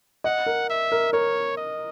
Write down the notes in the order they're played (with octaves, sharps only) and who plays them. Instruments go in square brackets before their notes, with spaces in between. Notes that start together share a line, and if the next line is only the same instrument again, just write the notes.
[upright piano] D#5 [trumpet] F#5
[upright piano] A#4
[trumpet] E5
[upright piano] A#4
[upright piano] A#4 [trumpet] C#5
[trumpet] D#5